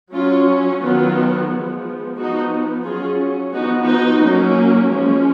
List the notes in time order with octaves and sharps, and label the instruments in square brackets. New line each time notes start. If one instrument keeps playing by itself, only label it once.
[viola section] F#3 C#4 F4
D#3 F#3 B3 F4
F3 G#3 B3
F3 B3 D#4 F#4
F#3 C#4 F4 G#4
F3 B3 D#4 F#4
D#4 F#4
F#3 A#3 C#4
F3 G#3 C#4